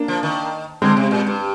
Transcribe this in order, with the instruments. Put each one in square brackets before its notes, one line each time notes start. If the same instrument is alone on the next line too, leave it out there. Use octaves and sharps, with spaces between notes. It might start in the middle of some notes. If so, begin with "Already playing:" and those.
Already playing: [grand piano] A#3 D4
[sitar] F3
D#3
[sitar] D3 [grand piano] G#3 C4
[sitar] C3
A#2
G2